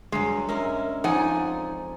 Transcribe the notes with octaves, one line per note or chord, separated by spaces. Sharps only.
G2 F#3 G#3
G#3 C#4 A#4 E5
F2 F3 D#4 D5 F#5 G#5